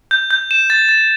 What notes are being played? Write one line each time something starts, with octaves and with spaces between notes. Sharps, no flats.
G6
G6
E7
A6
A6